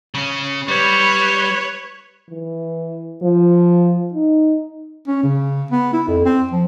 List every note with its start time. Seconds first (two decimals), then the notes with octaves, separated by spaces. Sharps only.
0.14 C#3 C#4
0.68 G3 B4 C#5
2.30 E3
3.23 F3
4.14 D#4
5.07 C#4
5.23 C#3
5.71 B3
5.93 E4
6.08 F2
6.25 C4
6.51 F3